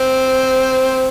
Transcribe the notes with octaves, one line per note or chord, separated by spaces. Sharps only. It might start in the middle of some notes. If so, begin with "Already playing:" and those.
Already playing: C4